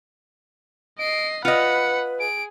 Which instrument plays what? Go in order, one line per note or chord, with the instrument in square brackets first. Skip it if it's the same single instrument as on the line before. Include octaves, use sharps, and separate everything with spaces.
[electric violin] D#5 C7 [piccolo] D7
[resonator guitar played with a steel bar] F4 D#5 [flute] B4 [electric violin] F#5 B5 [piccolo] C#7
[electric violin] G#4 [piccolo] D7